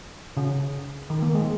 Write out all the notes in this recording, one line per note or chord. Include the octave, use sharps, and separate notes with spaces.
C#3
D#3
A#3
G#3